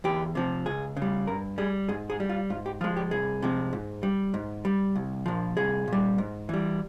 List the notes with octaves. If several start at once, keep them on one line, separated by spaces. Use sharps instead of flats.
E2 G4
C3 F3
C#2 G#4
C#3
G3
G2 A#4
G3 G#4
G#2 G#4
G#4
G3
F4
G#2 F4
G4
F3 G#3 F4
G4
C2 G#4
C3 F3 G#3
G#2
G3
G#2
G3
C2
A#2 F3
C2 G#4
A#2 G3
G#2
E3 G3